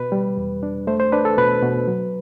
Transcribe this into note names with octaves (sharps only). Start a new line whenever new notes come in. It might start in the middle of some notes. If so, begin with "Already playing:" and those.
Already playing: B2 B4
G3
E2
D4
A3 C5
C5
D4 B4
A4
B2 B4
B2
F#3